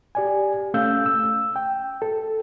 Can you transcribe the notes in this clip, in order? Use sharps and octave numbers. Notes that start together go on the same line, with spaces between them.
G4 D5 G#5
A3 C#4 F5 E6 G6
E6
G5
A4